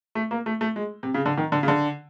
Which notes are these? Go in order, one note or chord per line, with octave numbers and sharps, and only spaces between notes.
A3
A#3
A3
A3
G#3
C3
C#3
D3
D#3
D3
C#3
D3